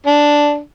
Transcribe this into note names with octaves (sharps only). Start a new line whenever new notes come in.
D4